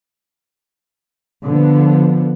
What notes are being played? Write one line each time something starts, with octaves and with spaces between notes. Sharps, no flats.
D3 F3 B3